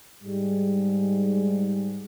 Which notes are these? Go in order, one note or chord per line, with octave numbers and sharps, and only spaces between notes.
G#2 G3 G#3